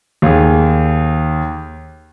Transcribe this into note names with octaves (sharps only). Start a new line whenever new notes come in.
D#2 G#4